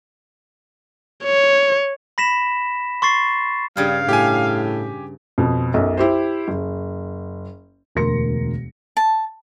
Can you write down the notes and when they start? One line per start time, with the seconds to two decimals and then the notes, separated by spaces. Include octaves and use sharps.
1.24 C#5
2.18 B5 A#6 B6 E7
3.02 C6 C#6 A6 C7
3.77 G2 C#3 G3 F5
4.09 A2 G4 G#5
5.38 F2 B2
5.74 B1 F#2
5.97 E4 G4 C5
6.48 F#1
7.95 E1 D2 A#4 C6 A#6 C#7
8.97 A5